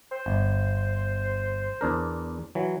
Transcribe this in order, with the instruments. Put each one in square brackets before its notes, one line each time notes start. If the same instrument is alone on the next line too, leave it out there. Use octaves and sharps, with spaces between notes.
[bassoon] C5
[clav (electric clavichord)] G1
E2 D4 A#4
E3 F#3